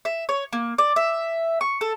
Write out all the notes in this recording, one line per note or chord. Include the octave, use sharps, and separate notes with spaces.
E5
C#5
A#3
D5
E5
C#6
A4